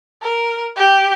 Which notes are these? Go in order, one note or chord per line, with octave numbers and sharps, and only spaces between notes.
A#4
G4